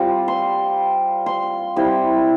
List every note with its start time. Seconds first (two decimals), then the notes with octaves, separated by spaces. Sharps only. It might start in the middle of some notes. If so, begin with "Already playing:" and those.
Already playing: G3 C4 F4
0.28 C6
1.26 C6
1.76 G3 C4 E4